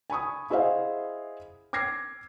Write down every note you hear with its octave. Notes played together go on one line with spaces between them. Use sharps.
G#5 B5 C#6 D#6
E4 G#4 C5 D#5 F5 F#5
D6 F6 G#6 A#6 C7